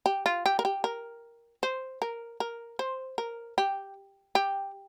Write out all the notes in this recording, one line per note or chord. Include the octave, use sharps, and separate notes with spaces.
G4
F4
G4
A#4
G4
A#4
C5
A#4
A#4
C5
A#4
G4
G4